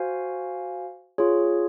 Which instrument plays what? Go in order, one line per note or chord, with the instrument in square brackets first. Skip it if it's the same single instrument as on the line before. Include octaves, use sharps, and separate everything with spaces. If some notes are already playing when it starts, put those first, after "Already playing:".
Already playing: [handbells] F#4 C5 F5 G#5
F4 G#4 C#5